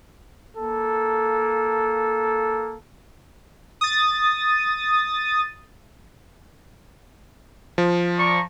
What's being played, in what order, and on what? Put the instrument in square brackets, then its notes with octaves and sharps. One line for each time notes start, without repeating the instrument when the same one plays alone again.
[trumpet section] A#3 A4
[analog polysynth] D#6 A6
[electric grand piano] F3
[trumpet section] D5 A#5 C#6